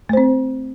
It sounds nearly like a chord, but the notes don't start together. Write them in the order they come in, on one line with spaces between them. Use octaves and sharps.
A3 C5 C4